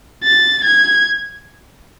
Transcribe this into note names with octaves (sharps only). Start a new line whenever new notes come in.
A6
G#6